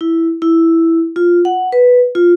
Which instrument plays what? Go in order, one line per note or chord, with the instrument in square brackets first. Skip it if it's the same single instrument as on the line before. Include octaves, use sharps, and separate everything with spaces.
[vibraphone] E4
E4
F4
F#5
B4
F4